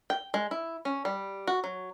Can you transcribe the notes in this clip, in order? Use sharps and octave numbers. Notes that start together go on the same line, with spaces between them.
G5
G#3
E4
C#4
G3
F#4
F#3